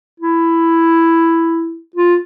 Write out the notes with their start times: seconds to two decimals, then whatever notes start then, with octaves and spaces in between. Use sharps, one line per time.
0.20 E4
1.96 F4